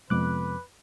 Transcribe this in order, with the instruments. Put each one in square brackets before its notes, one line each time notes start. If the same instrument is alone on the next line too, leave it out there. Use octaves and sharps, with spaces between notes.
[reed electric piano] F2 D6 F#6 [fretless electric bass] C3 G#3 B3 [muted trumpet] B4